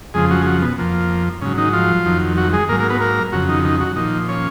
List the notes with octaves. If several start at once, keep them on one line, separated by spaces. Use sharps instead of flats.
F2 C#3 F3 G#3 G#4
F#3 F#4
G#4
F#3 F#4
B2 B3
F2 F3 A#3
G#2 C#3 F#3 C#4
D#3 D#4
F3 F4
F2 D#3 F#3
F#3 F#4
G#3 G#4
G#2 F#3 A#3 A#4
A#3 A#4
B3 B4
A#3 A#4
F2 C#3 F#3 F#4
D#3 D#4
D#3 D#4
F#3 F#4
A#2 D#3 F3 D#4
C#4 C#5